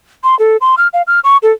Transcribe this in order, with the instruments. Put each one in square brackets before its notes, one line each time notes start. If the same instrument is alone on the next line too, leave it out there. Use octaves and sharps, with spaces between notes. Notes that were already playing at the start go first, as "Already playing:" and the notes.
[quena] C6
A4
C6
F6
F5
F6
C#6
A4